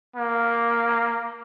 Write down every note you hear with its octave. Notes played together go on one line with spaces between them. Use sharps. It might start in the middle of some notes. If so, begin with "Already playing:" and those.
A#3